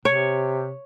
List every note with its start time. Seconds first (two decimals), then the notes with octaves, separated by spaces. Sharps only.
0.05 C3 C#5